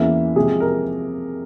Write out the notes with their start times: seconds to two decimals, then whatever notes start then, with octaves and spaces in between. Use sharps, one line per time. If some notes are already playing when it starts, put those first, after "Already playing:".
Already playing: E2 E3 A#3 C#4 E4 E5
0.36 C3 F3 G#3 G#4
0.60 A#4